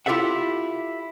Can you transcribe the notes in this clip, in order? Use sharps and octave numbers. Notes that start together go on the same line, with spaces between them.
E4 F4 G4 A4 E5 F#5